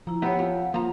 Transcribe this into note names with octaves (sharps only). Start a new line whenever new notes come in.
F3 E4 A#5
B3 C4 E4 G4 C#5 F#5
F2 F5
F3 A#3 A#5